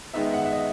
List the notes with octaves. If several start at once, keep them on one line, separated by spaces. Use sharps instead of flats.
D#3 G#3 B3 D#4 E5
F#5
E5
D#5